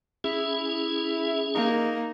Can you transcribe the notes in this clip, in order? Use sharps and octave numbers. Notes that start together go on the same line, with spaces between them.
C#4 E4 G#4
A#3 D#4